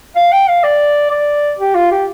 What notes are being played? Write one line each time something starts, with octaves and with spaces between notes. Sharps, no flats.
F5
G5
F5
D5
D5
G4
F4
G4